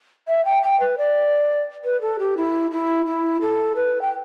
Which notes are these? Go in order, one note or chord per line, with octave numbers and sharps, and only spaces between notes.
E5
G5
G5
B4
D5
B4
A4
G4
E4
E4
E4
A4
B4
G5